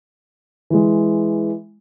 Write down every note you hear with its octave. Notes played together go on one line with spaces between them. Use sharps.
E3 G#3